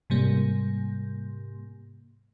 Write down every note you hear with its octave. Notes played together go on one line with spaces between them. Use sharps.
G#2 C3 G3 A#3